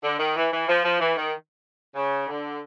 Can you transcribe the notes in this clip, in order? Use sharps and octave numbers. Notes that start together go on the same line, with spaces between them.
D3
D#3
E3
E3
F3
F3
E3
D#3
C#3
D3